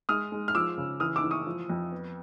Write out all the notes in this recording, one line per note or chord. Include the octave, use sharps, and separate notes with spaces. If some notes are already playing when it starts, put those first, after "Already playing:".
G#3 D#6 F6
G#3
F6
F3 D6 E6
C#3
E3 D#6 F6
D6 E6
E3
C#6 D#6
F3
F2
B3